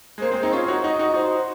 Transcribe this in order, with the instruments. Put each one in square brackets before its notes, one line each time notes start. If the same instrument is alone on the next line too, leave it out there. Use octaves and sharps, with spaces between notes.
[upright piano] G#3
[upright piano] A#3 [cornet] C5
[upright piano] G#3 C4
C4 D#4
[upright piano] C#4 F4 [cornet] C#5
[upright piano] D#4 F#4
[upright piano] D#4 F#4 [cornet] D#5
[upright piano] D#4 F#4
[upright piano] D#4 F#4 [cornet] C5